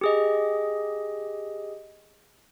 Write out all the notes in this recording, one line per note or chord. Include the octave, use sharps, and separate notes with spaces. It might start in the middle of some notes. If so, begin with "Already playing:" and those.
G4 G#4 D#5